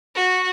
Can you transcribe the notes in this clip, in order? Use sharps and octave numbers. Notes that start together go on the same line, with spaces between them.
F#4